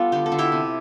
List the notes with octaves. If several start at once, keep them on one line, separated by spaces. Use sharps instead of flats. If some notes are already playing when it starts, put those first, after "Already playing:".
Already playing: G3 B3 F4 A4
D3 G4
A4
D3
E4 G4
C3